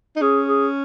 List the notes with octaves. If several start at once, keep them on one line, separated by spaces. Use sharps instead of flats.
D#4
C#4 G#4
G#4